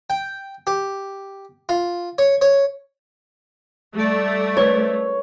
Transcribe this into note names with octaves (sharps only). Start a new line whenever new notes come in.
G5
G4
F4
C#5
C#5
G3 A3 D5
B4 C#5 G#6